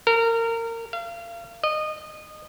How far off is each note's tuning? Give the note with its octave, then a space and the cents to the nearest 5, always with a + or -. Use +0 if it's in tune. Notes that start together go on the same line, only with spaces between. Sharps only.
A#4 -25
F5 -30
D#5 -20